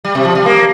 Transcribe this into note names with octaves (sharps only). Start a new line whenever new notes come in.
G3
C3
F3
G3
A#3